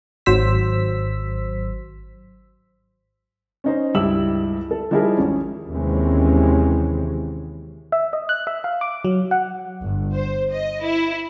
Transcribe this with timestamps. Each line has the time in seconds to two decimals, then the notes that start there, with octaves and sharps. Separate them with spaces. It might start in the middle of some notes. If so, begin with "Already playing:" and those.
0.26 G#1 F#3 C5 E6 B6
3.64 C#4 D#4 C5
3.95 C#2 G2 E4 G4 E6 F#7
4.71 A4
4.91 F3 G3 D#4 E4 G#4 A#4
5.18 G#1 C#4
5.70 D#2 C3 E3 G#3 C4 C#4
7.92 E5
8.13 D#5
8.29 F#6
8.47 E5
8.64 F5
8.81 D6
9.05 F#3
9.31 F#5
9.82 G1
10.14 C5
10.51 D#5
10.83 E4